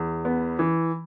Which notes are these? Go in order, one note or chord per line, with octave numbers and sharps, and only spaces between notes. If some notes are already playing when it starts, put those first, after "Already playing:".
Already playing: E2
B3
E3